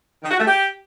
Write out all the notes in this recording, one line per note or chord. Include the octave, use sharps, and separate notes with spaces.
D#3
F#4
A3
G4